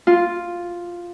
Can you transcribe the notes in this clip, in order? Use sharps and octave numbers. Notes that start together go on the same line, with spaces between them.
F4